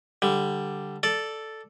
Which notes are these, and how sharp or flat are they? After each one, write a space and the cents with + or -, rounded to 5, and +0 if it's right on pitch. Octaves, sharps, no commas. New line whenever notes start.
D3 +0 G3 +0
A4 +0 D5 +0